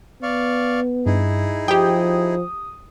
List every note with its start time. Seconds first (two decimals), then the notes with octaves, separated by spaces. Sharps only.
0.23 B3 D5 F5 C#6
1.06 G2 D#4 E4 G#4
1.68 F3 G4 G5 D#6